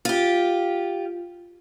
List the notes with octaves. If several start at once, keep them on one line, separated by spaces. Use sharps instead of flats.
F4 G4